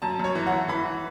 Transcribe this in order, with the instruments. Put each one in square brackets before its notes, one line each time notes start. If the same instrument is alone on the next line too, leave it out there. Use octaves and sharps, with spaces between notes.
[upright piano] F#2 A5
F#2 C#5
E3
F#5
E3
E3 B5
E3